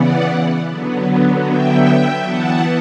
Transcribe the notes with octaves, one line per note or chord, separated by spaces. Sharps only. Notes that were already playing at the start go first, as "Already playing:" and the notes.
Already playing: C#3 E3 B3 D5 F#5
D3 F#3 B3
E5 G5
E3 B3 F#5 A5